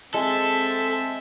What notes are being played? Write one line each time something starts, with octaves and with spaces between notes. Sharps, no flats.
G#3 C4 A4 E5